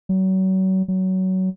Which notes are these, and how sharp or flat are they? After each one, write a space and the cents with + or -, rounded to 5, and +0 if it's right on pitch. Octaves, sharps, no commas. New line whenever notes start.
F#3 +35
F#3 +20